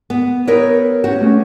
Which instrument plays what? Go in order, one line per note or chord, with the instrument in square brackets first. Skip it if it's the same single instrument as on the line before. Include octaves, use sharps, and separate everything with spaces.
[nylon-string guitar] B3
[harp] G4 D#6 E6 [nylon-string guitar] A#4 B4 C#5
[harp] C#4 G4 [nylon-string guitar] F#4
[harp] A3 C#4 D4